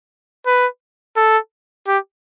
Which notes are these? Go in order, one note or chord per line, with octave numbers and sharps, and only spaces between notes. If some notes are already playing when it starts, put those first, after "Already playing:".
B4
A4
G4